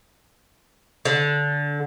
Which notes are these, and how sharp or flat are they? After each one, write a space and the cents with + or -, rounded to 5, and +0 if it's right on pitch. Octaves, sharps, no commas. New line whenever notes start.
D3 -15